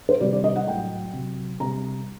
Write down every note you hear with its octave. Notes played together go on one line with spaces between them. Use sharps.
C5
C3 D#3 G3 D5
D5
D#5
F#5
A2 F#3 G5
C3 F#3
C3 G3 A#5